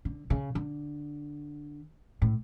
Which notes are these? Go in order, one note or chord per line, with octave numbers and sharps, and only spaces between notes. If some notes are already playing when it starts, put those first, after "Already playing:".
D3
C#3
D3
A2